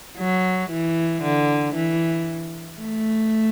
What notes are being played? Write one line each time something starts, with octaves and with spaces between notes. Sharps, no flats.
F#3
E3
D3
E3
A3